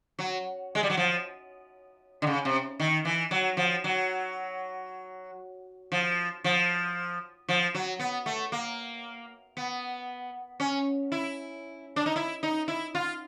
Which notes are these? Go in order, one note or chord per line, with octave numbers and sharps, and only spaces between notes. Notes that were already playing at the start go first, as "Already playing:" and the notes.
F#3
G#3
G3
F#3
F3
D3
C#3
C3
D#3
E3
F#3
F3
F#3
F3
F3
F3
F#3
B3
A3
A#3
B3
C#4
E4
D4
D#4
E4
D#4
E4
F4